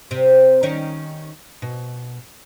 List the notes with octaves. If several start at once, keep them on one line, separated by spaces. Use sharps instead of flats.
C3 C4
D#3 C#4 C#5
B2